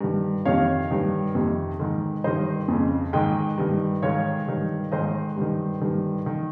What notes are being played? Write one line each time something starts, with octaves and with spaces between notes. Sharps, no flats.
G2 D#3
F2 C3 D#3 C#5 F5
G2 D#3
F2 C3 D#3
G#2 D#3
G2 D#3 C5 D#5
F2 C#3
G#2 D#3 D#5 G5
G2 D#3
G#2 D#3 C#5 F5
G2 D#3
G#2 D#3 C5 D#5
G2 D#3
G2 D#3
D#3